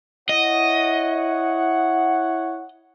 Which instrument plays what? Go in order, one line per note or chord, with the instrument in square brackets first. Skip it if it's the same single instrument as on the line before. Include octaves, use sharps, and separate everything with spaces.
[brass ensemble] E4 C#5 F#5 [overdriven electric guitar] D#5